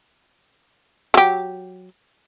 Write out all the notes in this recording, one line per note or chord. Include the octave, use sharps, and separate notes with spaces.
F#3 G4